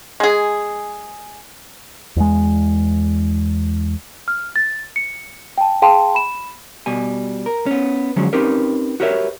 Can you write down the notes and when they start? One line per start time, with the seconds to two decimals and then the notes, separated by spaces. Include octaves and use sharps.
0.20 G#3 G#4
2.16 E2 G#3
4.28 F6
4.56 A6
4.96 C#7
5.58 G5 A5
5.82 G#4 F5 G5 A5 C6
6.15 B5 E7
6.86 B2 G3 G#5
7.46 A#4
7.66 B3 C#4
8.16 D3 F3 F#3 G#3 C#4
8.33 C4 C#4 D#4 G4 A#4 B4
9.00 F#4 G4 A#4 B4 C#5 E5